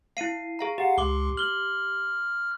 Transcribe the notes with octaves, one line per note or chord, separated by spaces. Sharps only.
E4 F5 C7 D#7
G#4 F5 A#5
G4 F5 F#5
C#2 C6 D6 G7
F6 F#7 G7